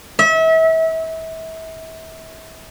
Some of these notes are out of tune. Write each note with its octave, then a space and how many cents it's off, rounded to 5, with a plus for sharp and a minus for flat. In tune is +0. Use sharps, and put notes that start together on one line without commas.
E5 -35